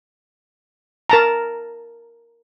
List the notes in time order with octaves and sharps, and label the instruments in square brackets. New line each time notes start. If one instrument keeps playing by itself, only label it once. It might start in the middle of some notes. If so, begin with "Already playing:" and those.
[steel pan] A#4 A5 A#5